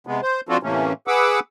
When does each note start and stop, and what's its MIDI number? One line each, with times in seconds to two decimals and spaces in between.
0.07 0.21 48
0.07 0.21 56
0.07 0.21 59
0.22 0.41 72
0.49 0.58 53
0.49 0.58 60
0.49 0.58 62
0.49 0.58 65
0.49 0.58 66
0.49 0.58 69
0.63 0.93 45
0.63 0.93 48
0.63 0.93 52
0.63 0.93 57
0.63 0.93 58
0.63 0.93 61
1.07 1.40 68
1.07 1.40 71
1.07 1.40 78
1.07 1.40 86
1.07 1.40 88